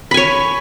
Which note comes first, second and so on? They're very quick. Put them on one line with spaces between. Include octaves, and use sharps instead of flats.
B5 G#5 C#5